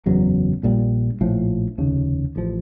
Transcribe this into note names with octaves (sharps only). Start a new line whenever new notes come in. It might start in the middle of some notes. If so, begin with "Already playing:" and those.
F#1 E2 C#3 F#3
A#1 A#2 G3
A#1 A2 F3
F1 D#2 C#3
A1 F3